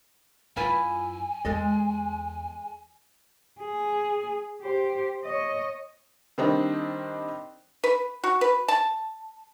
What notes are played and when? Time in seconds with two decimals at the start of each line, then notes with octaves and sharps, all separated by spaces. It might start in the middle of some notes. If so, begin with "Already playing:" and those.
0.56 F#2 E4 F4 B4 G#5
1.45 E2 G#3 A4 D#5
3.61 G#4
4.63 G4 C5
5.24 C#5 D#5
6.38 D#3 G3 C4 D4 D#4
7.84 B4
8.24 F#4
8.41 B4
8.68 A5